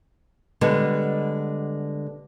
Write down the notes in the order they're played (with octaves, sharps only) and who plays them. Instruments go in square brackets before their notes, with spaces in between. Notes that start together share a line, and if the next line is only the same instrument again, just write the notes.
[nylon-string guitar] D3 G3 G#3 B3